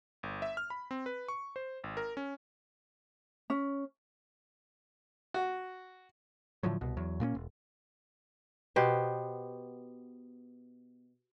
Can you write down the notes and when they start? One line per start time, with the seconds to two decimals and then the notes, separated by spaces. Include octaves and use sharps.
0.23 G1
0.42 E5
0.57 F6
0.70 B5
0.91 C4
1.06 B4
1.28 C#6
1.56 C5
1.84 G#1
1.97 A#4
2.17 C#4
3.50 C#4
5.34 F#4
6.63 A2 D3 F3 F#3
6.81 C2 B2
6.97 E2 F#3
7.20 A#2 A#3 B3 C#4
7.35 E1
8.76 B2 B3 G4 C5